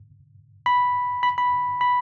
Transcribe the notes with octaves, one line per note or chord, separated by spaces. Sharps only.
B5
B5
B5
B5